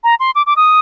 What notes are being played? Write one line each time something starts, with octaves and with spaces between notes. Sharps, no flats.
A#5
C6
D6
D6
D#6